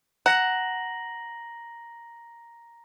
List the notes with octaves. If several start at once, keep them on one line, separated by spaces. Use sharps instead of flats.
F#5 A#5 A#6 F#7